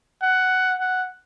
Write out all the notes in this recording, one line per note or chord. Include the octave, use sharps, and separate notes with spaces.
F#5
F#5